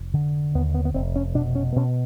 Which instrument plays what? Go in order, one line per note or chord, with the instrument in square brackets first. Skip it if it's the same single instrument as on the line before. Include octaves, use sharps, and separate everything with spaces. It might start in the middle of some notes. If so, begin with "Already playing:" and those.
Already playing: [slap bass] F1
D3
D#2 B3
B3
B3
F1 C4
C#4
B2 D4
C#4
B2 C#4